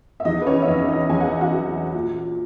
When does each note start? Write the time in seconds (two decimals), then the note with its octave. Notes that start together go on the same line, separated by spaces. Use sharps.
0.20 E5
0.25 E2 D#4 D#5
0.42 B4
0.46 C#4 C#5
0.62 E5
0.68 E2 D#4 D#5
0.88 D#4 D#5
1.10 E2 G#5
1.20 F#5
1.31 E5
1.41 F#4 F#5
1.52 F#3
1.94 A#2